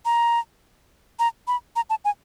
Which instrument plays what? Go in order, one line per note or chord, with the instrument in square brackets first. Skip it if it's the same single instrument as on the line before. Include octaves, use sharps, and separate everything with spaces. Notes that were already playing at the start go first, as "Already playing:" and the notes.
[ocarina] A#5
A#5
B5
A#5
A5
G#5